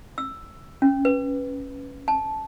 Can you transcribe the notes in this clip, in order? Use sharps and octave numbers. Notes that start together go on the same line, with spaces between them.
E6
C#4
B4
A5